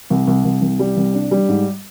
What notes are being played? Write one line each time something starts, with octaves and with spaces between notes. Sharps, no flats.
C2
C2
C2
C2
G3
C2
D4
G3
G#2